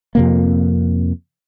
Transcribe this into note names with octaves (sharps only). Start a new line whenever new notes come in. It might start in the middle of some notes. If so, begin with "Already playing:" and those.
F2 C3 A#3